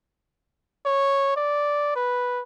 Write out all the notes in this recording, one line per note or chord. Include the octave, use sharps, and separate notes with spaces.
C#5
D5
B4